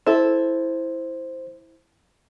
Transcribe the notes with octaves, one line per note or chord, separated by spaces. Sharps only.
E4 A4 C5